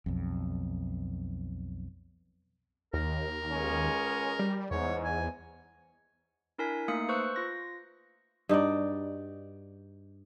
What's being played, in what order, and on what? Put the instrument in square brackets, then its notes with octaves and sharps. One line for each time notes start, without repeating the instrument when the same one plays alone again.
[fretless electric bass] B1 F2
[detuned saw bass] D#2 [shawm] A#4
[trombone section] C#2 G#3 C#4
[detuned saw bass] G3
[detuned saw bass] E2 [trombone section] G#2 [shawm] C#5
[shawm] G#5
[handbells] D4 E4 A#4 G#5 B6
A3 A#3 D#4 F5 D#6 C#7
B4 C5 C#6 E6 F#6
F4 A#6
[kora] G2 D#4 F#4 D5